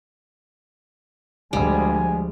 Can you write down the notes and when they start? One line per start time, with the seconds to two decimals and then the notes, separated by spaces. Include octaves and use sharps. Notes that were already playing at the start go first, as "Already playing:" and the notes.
1.53 D2 F3 G3 G#3 G#5